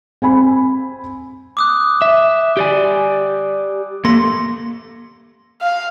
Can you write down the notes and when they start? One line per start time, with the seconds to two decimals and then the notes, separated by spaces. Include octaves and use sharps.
0.22 C4 G#5 B5
1.57 D6 D#6 F#6
2.02 E5
2.57 G4 D5 G#5
4.05 A#3 A4 C6 A#6
5.62 F5